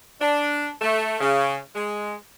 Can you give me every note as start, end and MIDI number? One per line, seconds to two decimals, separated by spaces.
0.21 0.69 62
0.81 1.17 57
1.21 1.58 49
1.75 2.13 56